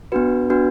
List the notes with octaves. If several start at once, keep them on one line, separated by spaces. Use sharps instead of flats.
B3 D4 F#4 B4
B3 D4 F#4 B4